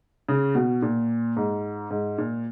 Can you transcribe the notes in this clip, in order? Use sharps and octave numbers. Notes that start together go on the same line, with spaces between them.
C#3
B2
A#2
G#2
G#2
A#2